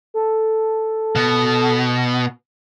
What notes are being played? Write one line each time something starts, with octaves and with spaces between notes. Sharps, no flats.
A4
B2